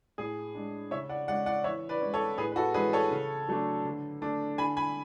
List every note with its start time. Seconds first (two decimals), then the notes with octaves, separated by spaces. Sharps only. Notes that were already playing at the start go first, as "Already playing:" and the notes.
0.18 A2 G#4
0.55 G#3 D4
0.91 C#3 C#5 E5
1.09 D5 F#5
1.28 G#3 C#4 D5 F#5
1.46 D5 F#5
1.64 E3 C#5 E5
1.89 B4 D5
2.01 G#3 C#4
2.14 A4 C#5
2.38 A2 G#4 B4
2.52 B4
2.56 F#4 A4
2.74 E3 G#3 C#4 G#4 B4
2.93 A4 C#5
3.11 C#3
3.48 F#3 A3 D4
3.85 D3
4.22 A3 D4
4.58 D3 G#5 B5
4.77 G#5 B5